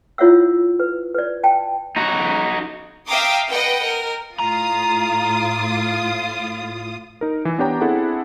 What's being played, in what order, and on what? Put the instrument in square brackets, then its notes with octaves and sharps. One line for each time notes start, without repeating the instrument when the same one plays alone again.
[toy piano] E4 F4 C#5 E5 F#5 E6
B4
B4 D5
G5 A5
[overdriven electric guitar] D#4 F#4
[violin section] E5 F5 G5 A#5 D6 D#6
B4 D#5 F#5 G5
A#4
[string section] A2 F4 D#6 [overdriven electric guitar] A#5
[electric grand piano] D#4 A#4
E3 E4
B3 D4 G4 C#5 G5 A#5
C4 D4 E4 G#4 A4 F#5